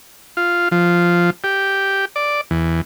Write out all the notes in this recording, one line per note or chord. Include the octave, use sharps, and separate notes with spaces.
F4
F3
G4
D5
E2